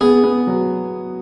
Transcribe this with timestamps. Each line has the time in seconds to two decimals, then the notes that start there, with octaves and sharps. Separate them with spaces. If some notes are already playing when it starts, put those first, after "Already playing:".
0.01 B3 G#4
0.24 B3
0.47 F#3